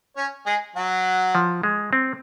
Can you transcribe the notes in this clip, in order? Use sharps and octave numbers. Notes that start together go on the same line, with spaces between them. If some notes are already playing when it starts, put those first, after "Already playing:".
C#4 C#5
G#3 G#4
F#3 F#4
F3
G#3
C4